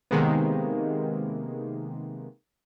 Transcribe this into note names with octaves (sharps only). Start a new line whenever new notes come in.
C3 D#3 G#3 A#3 B3